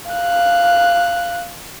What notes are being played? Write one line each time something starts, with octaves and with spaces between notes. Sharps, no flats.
F5 F#6